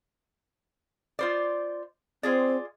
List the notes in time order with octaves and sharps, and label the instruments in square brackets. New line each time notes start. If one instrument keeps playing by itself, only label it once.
[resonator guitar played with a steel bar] F4 C5 D5
[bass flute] C4 [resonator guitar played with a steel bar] F4 G#4 D5